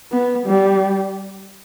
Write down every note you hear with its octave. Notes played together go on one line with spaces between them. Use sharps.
B3
G3